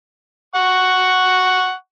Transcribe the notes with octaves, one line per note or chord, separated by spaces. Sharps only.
F#5 C#6